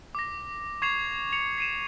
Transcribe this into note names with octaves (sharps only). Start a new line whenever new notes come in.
D6 A#6
C#6 G#6 C7 E7 F7
C#7 F7
C7 D#7 E7